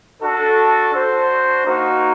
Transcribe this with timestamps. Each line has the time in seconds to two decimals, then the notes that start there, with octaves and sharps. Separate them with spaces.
0.22 D4 F#4 A4
0.93 D4 F#4 C5
1.65 A#3 D#4 F#4